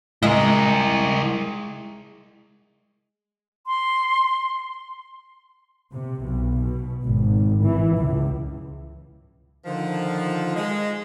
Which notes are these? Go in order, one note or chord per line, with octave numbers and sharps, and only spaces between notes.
G#3 E4 A#4 D#5
C6
C3
B1
B2
G#1
E3
C#2
D3 D#3 F3
G#3